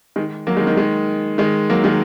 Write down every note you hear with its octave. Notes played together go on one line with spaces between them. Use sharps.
D#3 G#3
F#3 A#3
D#3 G#3
D#3
D#3 G#3
D#3 G#3
F#3 A#3
D#3 G#3